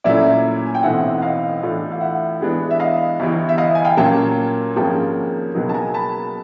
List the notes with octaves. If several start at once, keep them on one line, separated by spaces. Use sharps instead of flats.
A#2 F#3 A3 C#4 E4 D5 E5
G#5
G5
B1 A2 E3 A3 C4 E5 F#5
F#5
D#5 F5
A2 E3 A3 D4 F4
F5
E5 F#5
G2 E3 G#3 B3 D4
E5
D#5 F5
G1 G2 E3
E5
D#5 F5
G#5
F5 G5
A#2 F#3 A#3 C#4 G5 A5
G#1 G#2 F3 A#3 C#4 G5 A5
C#2 B2 F#3 A#3 D#4
A5
G#5 A#5
A5 B5